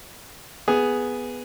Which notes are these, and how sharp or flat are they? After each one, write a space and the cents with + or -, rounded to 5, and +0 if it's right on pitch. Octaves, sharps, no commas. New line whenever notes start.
B3 +0 G#4 +0